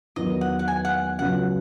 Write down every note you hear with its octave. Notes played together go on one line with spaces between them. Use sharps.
E2 D#3 F#3 B3 D#4 D#5
F#5
F#5
G#5
F#5
C#2 C#3 F#3 F#5